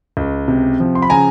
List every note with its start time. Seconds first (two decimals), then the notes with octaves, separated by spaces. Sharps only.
0.17 C#2
0.48 C3
0.80 F3
0.95 C6
1.02 B5
1.10 C#3 G#5 A#5